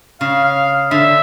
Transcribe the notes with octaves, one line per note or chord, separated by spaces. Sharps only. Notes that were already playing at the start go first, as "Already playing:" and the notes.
C#3 F5
F5
D3 E5